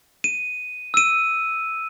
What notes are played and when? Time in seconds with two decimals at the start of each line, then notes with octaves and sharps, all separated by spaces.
0.24 D#7
0.94 E6 D#7